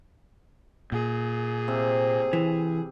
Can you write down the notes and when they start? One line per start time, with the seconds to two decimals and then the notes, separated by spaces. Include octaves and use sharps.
0.92 A#2 G#4
1.68 C3
2.33 E3